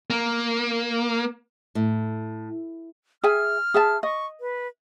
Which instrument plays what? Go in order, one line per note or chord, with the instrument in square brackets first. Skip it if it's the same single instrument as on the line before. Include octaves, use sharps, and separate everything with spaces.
[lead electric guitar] A#3
[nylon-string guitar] A2
[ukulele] G#4 E5 G#5 [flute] F6
[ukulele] G#4 E5 A5
[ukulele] D#5 [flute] C#6
[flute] B4